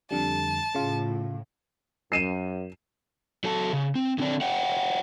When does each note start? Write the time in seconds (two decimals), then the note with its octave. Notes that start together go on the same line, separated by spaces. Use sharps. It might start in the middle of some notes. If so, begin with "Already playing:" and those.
0.11 F2 D3 G3 A5
0.75 A2 C#3 F4
2.12 F#2 C7 D#7 E7
3.44 F#3 A4 A5
3.73 C#3
3.95 C4
4.18 D3 C4 D4
4.41 C#5 E5 F#5 G5